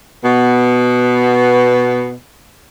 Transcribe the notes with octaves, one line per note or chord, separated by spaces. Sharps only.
B2 B3